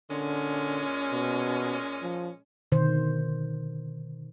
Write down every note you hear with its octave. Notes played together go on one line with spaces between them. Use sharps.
A#2 D3 G#3 C#4
B2
F3
B2 D3 D#3 C5